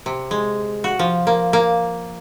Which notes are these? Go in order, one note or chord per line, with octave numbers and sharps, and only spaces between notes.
C3
G#3
F#4
F3
A#3
A#3